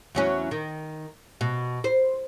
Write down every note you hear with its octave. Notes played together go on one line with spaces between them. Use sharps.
E2 F#3 C#4
D#3
B2
C5